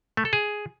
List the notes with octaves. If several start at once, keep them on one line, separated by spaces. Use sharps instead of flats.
A3
A4
G#4